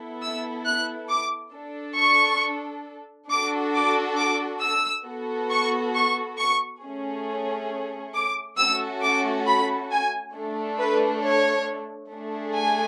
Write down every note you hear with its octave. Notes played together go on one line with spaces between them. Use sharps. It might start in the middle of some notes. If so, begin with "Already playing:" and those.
Already playing: B3 E4 A4
E6
F#6
D6
D4 A4
C#6
D4 F#4 A4 D6
D6
D6
E6
B3 F#4 A4
C#6
C#6
C#6
A3 C#4 G#4
D6
A3 C#4 F#4 A4 E6
D6
B5
G#5
A3 D4 A4
B4
C#5
A3 D4 G#4
G#5